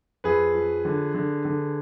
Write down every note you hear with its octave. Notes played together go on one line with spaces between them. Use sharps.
F2 G#4 B4
F3
D3
D3
D3